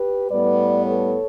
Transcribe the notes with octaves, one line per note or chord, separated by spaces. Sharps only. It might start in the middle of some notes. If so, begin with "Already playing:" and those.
Already playing: G4 B4
A2 G3 B3 B4 D5
A4 C#5